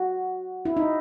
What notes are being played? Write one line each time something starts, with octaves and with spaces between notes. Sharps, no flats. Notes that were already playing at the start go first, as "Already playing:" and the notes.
Already playing: F#4
E4
D#4